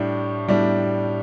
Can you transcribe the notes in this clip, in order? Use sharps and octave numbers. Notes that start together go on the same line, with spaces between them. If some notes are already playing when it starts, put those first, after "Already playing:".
Already playing: A2 G3 D4
A2 G3 D4